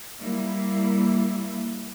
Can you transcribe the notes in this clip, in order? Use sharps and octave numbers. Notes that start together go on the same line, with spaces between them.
G3 A#3 E4